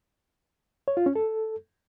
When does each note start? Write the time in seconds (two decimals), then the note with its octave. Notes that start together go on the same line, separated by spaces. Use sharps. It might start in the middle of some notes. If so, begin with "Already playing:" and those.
0.88 C#5
0.97 F4
1.06 C#4
1.16 A4